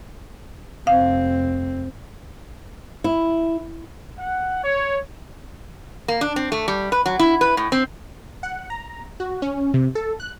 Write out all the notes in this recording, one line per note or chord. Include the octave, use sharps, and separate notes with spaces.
F1 C4 F5
E4
F#5
C#5
A#3
D4
C4
A3
G3
B4
F#3
E4
B4
A2
C4
F#5
A#5
F#4
C#4
C3
A4
F#6